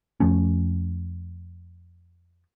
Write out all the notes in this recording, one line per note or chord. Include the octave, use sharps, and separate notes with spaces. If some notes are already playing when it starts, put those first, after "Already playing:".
F2 F3 A3 C#4